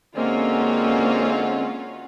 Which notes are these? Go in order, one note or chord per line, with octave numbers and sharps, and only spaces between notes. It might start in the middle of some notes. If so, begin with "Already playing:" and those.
D3 G#3 A#3 C4 C#4 F4 F#4